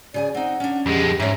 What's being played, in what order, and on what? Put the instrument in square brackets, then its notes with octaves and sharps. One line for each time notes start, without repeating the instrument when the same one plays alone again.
[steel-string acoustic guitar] C#3 G#4 G#5 [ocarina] D5
[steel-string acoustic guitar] C4 D#4 [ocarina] F#5
[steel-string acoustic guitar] C#4 D4
[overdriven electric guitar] F2 G#3 [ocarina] G4
[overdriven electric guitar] G#2 [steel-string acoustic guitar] C#4 C#5 [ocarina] E5